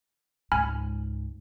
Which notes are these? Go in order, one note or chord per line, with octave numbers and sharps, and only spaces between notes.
C#2 G#2 G#5 B5 F6